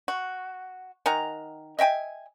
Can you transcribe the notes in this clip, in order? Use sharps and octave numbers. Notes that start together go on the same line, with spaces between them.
F#4
D#3 F#5 G#5 A#5
D#5 E5 G5 G#5